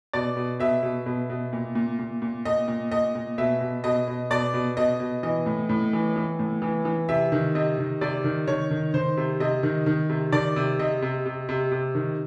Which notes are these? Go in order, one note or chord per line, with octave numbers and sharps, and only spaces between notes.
B2 D5
B2
B2 E5
B2
B2
B2
A#2
A#2
A#2
A#2
A#2 D#5
A#2
A#2 D#5
A#2
B2 E5
B2
B2 D#5
B2
B2 D5
B2
B2 D#5
B2
E3 D#5
A2
A2
E3
E3
A2
E3
E3
C3 E5
D#3
C3 D#5
D#3
C3 D5
D#3
D#3 C#5
D#3
D#3 C5
C3
C3 D#5
D#3
D#3
C3
D#3 D5
C3
C3 D#5
C3
C3
C3
C3
D#3